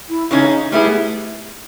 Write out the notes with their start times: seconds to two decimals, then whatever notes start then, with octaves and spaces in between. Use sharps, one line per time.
0.09 E4
0.31 C#3 E3 G#3 C#4 D#4
0.71 G3 A3 B3 E4 G#4
0.92 A3